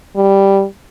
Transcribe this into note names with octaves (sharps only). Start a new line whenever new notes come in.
G3